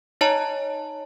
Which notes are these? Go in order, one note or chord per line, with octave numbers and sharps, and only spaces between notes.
D#4 C#5 D#5 A5 A#5